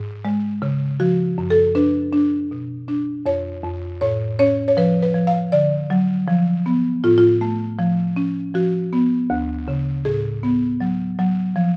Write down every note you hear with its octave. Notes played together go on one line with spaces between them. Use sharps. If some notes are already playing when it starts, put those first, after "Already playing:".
Already playing: G#2
G#3
C#3
F3 F#4
F#2
A4
D4 B4
D4
B2
D4
F2 C#5
F2
A2 C#5
C#4 C#5
C#5
F3 B4
B4
F3
F5
D3 D5
F#3
F3
B3
A2 F4
F4
A3
F3
C#4
F3 F#4
B3
D2
C#3
A2 G#4
B3
F#3
F#3
F3